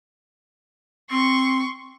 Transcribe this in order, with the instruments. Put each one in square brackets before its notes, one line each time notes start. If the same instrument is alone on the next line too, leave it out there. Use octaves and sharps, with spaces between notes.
[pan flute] C4 [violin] C6 C#6